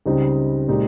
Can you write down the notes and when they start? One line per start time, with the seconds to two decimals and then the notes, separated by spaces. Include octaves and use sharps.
0.06 C#2 C#3 G3 C4 D#4
0.68 A#2 G#3 C4 D#4 G4